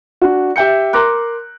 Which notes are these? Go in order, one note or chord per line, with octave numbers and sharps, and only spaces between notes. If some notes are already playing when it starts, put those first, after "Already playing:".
D4 F#4
G4 E5 G5 G6 C#7
A#4 A#5 C6 D6 F#6